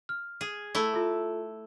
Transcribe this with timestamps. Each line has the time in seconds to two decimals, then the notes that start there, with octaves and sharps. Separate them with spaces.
0.09 F6
0.41 G#4
0.75 A3 E4
0.94 F4 A4